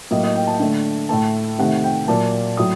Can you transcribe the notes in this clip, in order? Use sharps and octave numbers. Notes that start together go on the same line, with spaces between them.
A2 F#3 A#3 D#5
D#5
G5
A5
D3 A3
A2 A3 A5
C3 D#3 A3 F#5
G5
A#2 F#3 A#3 A5
A2 F#3 D#6